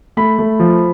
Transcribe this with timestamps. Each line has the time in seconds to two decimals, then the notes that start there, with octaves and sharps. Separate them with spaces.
0.17 A3 B5
0.39 A3
0.60 F3